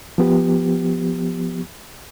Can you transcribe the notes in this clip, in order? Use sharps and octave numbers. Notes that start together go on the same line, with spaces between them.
F3 B3 G4